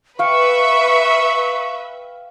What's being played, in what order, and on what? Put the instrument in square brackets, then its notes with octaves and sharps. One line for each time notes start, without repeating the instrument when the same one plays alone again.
[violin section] B4 E5 [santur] F5 G5 [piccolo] C#6